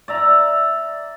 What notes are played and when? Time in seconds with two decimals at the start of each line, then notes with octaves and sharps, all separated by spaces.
0.08 D5 E5 A#5